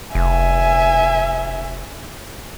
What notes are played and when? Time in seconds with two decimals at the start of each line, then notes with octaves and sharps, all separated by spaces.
0.15 F1 E5 G#5